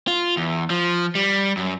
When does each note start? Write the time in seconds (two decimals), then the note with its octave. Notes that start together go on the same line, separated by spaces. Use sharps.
0.07 F4
0.37 E2
0.70 F3
1.15 G3
1.57 F#2